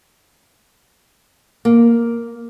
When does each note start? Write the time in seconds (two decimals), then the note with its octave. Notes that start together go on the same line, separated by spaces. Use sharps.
1.65 A#3